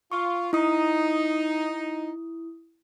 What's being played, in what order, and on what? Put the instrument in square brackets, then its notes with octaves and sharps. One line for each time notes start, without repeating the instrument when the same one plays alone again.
[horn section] F4 [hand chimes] C#6
[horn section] D#4 [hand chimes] E4 D#6